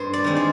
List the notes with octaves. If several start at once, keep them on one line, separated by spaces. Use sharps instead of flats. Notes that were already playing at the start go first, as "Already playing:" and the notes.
Already playing: G2 C5
D5
D#3 G#3 C4
D5